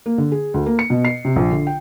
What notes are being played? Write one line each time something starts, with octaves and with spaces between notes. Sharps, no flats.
A#3
D3
G#4
D2
A#3
C#7
B2
C7
C3
A#1
D3
G5